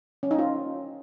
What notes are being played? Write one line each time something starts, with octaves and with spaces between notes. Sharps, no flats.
C#4
D#4
F4